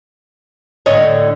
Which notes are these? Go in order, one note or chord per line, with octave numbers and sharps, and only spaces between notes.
A2 D3 D4 C#5 D#5